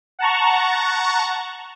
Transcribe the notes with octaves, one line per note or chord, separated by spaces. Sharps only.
F#5 A5 A#5 C#6